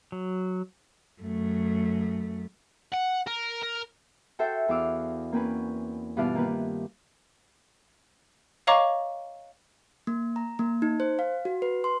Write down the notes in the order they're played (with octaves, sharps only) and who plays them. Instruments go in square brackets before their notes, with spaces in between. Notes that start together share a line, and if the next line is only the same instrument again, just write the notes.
[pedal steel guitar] F#3
[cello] F#2 A3
[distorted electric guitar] F#5
A#4
A#4
[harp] F#4 A4 C5 E5 G5
E2 F#4 F5 D6 E6
A#3 C4 C#4 B4
G2 B2 E3 F4 D5 F5
D#3 A#3 C4 B4
[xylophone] C#5 D#5 F5 A#5 C#6 D6
[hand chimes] A#3
A#5
A#3
D#4
C5
F5
F#4
B4
C6